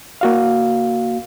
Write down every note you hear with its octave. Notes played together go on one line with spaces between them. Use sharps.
A#3 F#4 F5